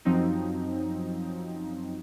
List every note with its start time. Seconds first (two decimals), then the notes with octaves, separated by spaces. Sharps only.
0.05 F#2 F3 F#3 C4 D#4